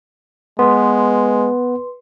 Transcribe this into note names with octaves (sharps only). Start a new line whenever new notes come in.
G#3 B3 B4 C6